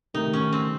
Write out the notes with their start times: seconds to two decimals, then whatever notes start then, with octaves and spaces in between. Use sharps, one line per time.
0.14 C3 D#3 A3 D#4
0.34 C#4
0.53 C4